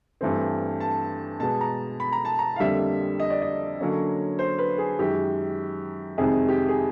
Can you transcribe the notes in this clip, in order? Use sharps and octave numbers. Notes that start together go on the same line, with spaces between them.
G2 E3 A3 C4
A5
B2 G#3 B3 A5
A#5
B5
A#5
A5
A#5
F5
F2 D3 G3 A#3 E5
D#5
D5
D#5
D3 F#3 A#3 C#4
C5
B4
G#4
F#2 D#3 G#3 G4
F2 C3 D#3 G#3 G#4
G4
G#4